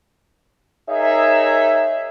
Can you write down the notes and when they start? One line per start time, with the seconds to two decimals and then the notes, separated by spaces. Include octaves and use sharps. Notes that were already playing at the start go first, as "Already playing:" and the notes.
0.90 D#4 G#4 A#4 C#5 E5